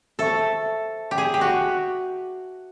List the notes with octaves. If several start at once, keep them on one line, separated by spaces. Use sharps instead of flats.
A4 C5 E5 A5 C#6
G4
G#4
G4
F#4